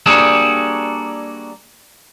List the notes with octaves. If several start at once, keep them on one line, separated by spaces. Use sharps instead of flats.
G3 A#3 D4 F#4 G#4 A4